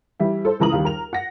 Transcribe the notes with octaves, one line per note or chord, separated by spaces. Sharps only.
E3 G3 E4
A4 C5
C#2 E3 A#4 A#5 D#6 F#7
D#2 G3 F5
A#4 F7
F#5 A#6